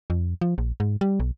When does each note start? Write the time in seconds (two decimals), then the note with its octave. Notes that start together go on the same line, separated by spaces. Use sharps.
0.10 F2
0.41 F3
0.58 A#1
0.80 G#2
1.01 G3
1.20 B1